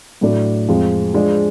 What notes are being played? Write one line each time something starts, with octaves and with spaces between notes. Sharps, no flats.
A2 F#3 A3 D4
F2 F3 G#3
F3 G#3 D4 G#4